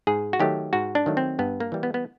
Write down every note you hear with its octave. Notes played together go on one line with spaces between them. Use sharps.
G#2 G#4
F#4
D#3 F#3 A3 G4
G#2 F#4
D4
D#3 F#3 A3
C4
G2 B3
A#3
E3 G3
B3
B3